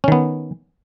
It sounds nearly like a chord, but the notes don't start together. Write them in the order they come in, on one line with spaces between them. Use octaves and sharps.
C#4 D#3 B3